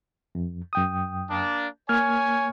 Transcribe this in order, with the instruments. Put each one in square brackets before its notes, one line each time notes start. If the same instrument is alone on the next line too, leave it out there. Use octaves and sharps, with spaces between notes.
[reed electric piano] F2
F#2 G5 D#6
[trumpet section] A#3 D4
[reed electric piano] A#3 F6 G#6 [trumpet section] C#5 G#5